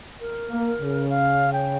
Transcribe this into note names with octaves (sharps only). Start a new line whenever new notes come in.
A#4
A#3
C#3
F5
G5